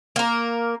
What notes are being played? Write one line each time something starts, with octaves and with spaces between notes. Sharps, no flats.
A#3 A#4